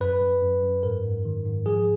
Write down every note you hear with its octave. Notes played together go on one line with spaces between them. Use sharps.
F#2 B4
F#2
F#2
F#2
G#2 A#4
G#2
D#3
G#2
F3 G#4